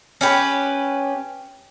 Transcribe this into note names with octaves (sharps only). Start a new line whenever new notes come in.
C#4 G4 B4